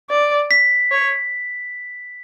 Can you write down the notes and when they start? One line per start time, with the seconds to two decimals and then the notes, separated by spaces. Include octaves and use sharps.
0.10 D5
0.51 B6
0.91 C#5